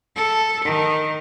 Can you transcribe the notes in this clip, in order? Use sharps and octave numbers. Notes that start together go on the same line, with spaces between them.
A4
D#3